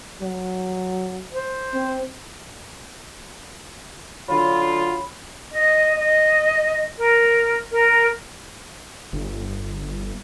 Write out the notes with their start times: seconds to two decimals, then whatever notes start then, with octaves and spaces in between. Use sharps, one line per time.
0.21 F#3
1.33 C5
1.73 C4
4.28 D3 F#3 F4 C#5 B5
5.50 D#5
5.94 D#5
6.96 A#4
7.71 A#4
9.13 G1